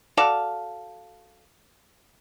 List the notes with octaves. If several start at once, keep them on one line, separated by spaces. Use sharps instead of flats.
F#4 A4 D5 F5